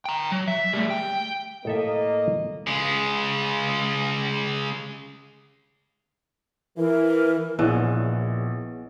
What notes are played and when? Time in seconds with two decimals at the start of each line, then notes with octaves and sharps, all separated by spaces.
0.06 G5 A#5
0.32 F#3
0.48 E5
0.73 G3 A3
0.91 G5
1.65 A2 A#3 A4 D#5 E5
2.67 C#3 G#3
6.78 E3 A#4
7.59 A#1 E3 B3 G#4 C#5 D#5